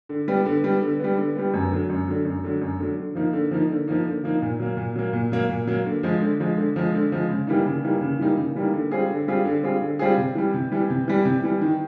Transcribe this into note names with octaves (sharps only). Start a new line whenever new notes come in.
D3
G3 B3
D3
G3 B3
D3
G3 B3
D3
G3 B3
F#2
D3 F#3
F#2
D3 F#3
F#2
D3 F#3
F#2
D3 F#3
D3
F3 A#3 D#4
D3
F3 A#3 D#4
D3
F3 A#3 D#4
D3
F3 A#3 D#4
A#2
F#3 A#3
A#2
F#3 A#3
A#2
F#3 A#3
A#2
F#3 A#3
D3
F3 G#3
D3
F3 G#3
D3
F3 G#3
D3
F3 G#3
C#3
E3 G3 A#3 D#4
C#3
E3 G3 A#3 D#4
C#3
E3 G3 A#3 D#4
C#3
E3 G3 A#3 D#4
D3
G3 C4 F4 G#4
D3
G3 C4 F4 G#4
D3
G3 C4 F4 G#4
D3
G3 C4 F4 G#4
C3
E3 G3
C3
E3 G3
C3
E3 G3
C3
E3 G3
D#3